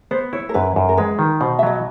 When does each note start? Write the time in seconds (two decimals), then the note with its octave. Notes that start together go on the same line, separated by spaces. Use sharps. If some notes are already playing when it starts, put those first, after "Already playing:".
0.11 B3 C5
0.33 E4 C#5
0.49 A#4
0.54 F#2 B4
0.76 F#2
0.89 A#4
0.97 G#3 B4
1.19 D#3
1.41 B2 C5
1.59 E5
1.63 F#3 D#5